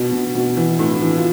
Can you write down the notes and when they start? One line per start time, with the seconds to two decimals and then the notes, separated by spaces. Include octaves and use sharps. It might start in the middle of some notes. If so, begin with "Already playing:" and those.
Already playing: B2
0.12 B2
0.35 B2
0.57 E3
0.79 A2
1.01 E3
1.16 F4